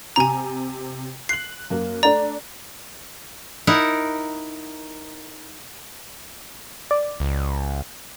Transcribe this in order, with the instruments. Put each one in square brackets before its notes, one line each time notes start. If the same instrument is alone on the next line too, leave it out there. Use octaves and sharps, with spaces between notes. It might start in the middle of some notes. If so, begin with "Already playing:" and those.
[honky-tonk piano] C3 F7 [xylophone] G#5 A#5
[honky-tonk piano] F#6 F#7 [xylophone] C7
[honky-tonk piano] F#2 A#3
[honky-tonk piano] A3 D4 [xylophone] D5 A#5
[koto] D#4 E4 A#4 F#5
[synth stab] D5
[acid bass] C#2